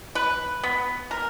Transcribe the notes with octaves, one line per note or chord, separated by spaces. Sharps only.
B4
B3
A#4